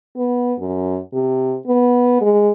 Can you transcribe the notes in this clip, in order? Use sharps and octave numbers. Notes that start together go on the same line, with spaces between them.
B3
F#2
C3
B3
G#3